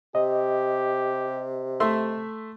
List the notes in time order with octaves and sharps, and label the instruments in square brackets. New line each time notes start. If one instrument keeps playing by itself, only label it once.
[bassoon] C3 [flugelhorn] G4 [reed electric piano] D#5
[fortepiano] A3 E5 C6